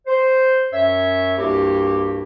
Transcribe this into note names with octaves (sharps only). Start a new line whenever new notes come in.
C5
F#2 C#5 E5
C2 G2 A#3 E4 F#4 G4